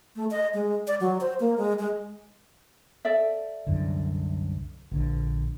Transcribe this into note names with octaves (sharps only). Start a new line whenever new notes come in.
A3
D#5
G#3
D5
F#3
C5
A#3
G#3
G#3
A4 D5 E5
C2 F#2 D3
A#1 D3